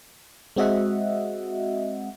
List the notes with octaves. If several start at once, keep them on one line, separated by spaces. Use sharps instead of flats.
G#3 C4 F#4 D#5 E5 F#5